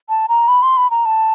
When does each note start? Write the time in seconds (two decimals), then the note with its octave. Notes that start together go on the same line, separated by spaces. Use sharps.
0.09 A5
0.29 A#5
0.48 B5
0.63 C6
0.77 B5
0.91 A#5
1.06 A5